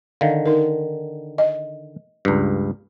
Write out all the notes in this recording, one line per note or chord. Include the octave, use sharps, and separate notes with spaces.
D3 D#3 F5
D#4 A#4
D#5
C#2 G2